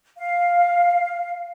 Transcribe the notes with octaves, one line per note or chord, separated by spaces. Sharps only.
F5